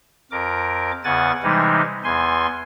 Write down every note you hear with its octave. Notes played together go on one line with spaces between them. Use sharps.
F2 A#4 D6
E2 C#3 F#5 G#5 A6
C3 E3 G3 G#3 D#4
E2 G#5 C6